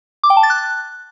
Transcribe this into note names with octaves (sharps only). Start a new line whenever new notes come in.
D6
G5
A5
A6
F#6